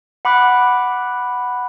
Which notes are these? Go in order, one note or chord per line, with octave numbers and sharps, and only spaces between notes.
F#5 B5 D6 F#6